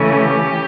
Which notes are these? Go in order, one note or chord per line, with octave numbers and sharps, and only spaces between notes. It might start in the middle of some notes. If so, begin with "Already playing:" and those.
Already playing: C#3 E3 A3 C#4
G4